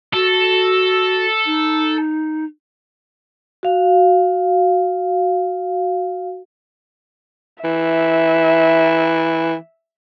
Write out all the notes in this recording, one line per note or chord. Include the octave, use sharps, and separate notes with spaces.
F#4 A4
D#4
F#4 F5
E3 E5